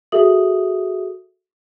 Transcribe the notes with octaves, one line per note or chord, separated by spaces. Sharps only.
F#4 G#4 A4 E5 D#6 F#7